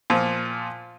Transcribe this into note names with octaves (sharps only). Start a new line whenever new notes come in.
A#2 F3